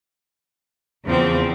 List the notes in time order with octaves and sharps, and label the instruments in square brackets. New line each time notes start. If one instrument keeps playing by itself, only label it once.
[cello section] E2 [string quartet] C#3 F3 C4